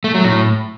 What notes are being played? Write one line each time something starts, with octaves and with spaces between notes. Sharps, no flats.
A3
F#3
A2